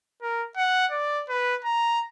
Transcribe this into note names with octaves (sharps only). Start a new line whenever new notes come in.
A#4
F#5
D5
B4
A#5